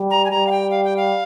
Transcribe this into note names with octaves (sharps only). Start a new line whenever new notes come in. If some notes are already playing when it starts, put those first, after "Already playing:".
Already playing: G3
A#5
G#5
G3 A#5
F5
G5
F5
G5
F5